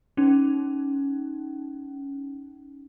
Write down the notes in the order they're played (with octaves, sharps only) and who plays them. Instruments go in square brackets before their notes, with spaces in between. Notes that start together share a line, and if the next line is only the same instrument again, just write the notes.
[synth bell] C#4 D#4